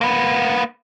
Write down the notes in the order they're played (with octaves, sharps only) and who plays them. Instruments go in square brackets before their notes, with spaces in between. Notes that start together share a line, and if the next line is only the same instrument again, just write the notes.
[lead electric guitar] A#3 B3